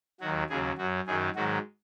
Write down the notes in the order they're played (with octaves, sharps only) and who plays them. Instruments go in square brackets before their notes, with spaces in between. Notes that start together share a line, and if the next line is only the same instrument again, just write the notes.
[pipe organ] D#2 D#3 F#3 F#4
D#2 C#3 F#3 G#4
F#2 F#4
F#3
F#2 D#3 F#3 G#4
G#2 D#3 F#3 F#4